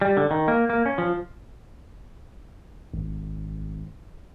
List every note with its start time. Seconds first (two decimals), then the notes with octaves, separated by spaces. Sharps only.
0.01 G3
0.17 D3
0.31 D#3
0.48 A#3
0.70 A#3
0.86 C#4
0.98 F3
2.94 G#1